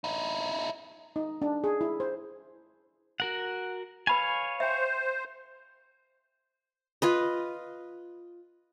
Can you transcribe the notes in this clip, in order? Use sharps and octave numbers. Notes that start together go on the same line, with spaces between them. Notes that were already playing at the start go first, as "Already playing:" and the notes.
D#4 E4
D#4
D4
G#4
E4
C5
F#4 A#4 F#5
B4 C#5 F5 G#5 B5 C#6
C5 E5 G5
F4 B4 D#5